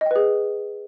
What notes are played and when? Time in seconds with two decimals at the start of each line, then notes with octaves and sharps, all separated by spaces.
0.01 D#5
0.06 G5
0.11 B4
0.16 G#4